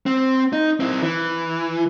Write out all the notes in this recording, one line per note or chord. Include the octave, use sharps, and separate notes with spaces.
C4
D#4
C4 E4
E3